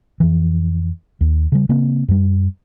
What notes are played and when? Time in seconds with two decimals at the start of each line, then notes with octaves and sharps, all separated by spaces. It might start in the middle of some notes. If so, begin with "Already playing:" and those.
0.20 F2 E3
1.21 D#2
1.52 C#3 G3
1.69 C#3 A#3 C4
2.08 F#2 G3